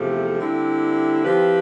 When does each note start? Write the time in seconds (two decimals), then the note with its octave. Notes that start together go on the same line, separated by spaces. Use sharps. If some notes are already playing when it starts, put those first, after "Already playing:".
Already playing: E2 C3 F3 A3
0.39 D3 G3 C4 E4
1.24 F3 C4 E4 G4 B4